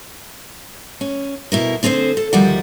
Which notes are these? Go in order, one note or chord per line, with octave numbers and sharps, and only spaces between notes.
C#4
B2 E4 A#4
D3 C4 G#4 A#4 C5
A4
D2 D#3 F3 G3 D5 F#5